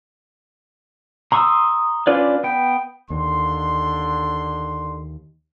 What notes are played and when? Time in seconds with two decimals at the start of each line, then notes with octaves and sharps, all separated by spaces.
1.32 A#5 C6 C#6 D#6 E6
2.07 C#4 D4 F4 B4 D5
2.44 B3 G5
3.10 D#2 D3 C6